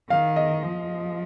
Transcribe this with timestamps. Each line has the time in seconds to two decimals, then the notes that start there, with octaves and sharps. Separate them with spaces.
0.10 D#3 F5
0.36 D#5
0.63 F3